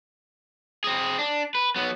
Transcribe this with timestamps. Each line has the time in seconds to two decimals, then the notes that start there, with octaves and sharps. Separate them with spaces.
0.84 C4 G#4
1.19 D4
1.55 B4
1.76 F#3 B3